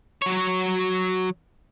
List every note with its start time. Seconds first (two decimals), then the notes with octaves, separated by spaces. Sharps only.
0.22 F#3 C#5